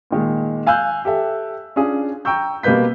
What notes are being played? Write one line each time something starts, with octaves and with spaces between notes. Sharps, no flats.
A#2 D#3 G#3
F5 G#5 E6 F#6 G6
G4 A4 E5
C#4 D4 F4 G#4
G5 A#5 C#6 E6 G6
B2 G3 A#3 B4 G6 B6